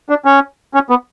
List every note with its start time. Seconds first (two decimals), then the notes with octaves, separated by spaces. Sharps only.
0.09 D4
0.25 C#4
0.74 C#4
0.90 B3